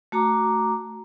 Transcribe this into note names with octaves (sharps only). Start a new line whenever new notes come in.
A3 F#4 A#5 D6